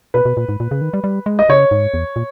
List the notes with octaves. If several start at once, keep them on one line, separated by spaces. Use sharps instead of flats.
B2 B4
B2
A#2
G#2
A#2
C#3
D#3
G3
G3
G#3
D#5
C#3 C#5
G#2
E2
A#2